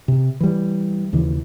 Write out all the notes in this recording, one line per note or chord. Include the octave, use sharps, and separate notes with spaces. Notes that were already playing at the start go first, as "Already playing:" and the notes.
C3
E3 G3
D#2 C#3 E3